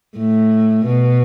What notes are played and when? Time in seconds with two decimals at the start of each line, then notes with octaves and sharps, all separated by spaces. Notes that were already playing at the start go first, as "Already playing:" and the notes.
0.18 A2
0.85 B2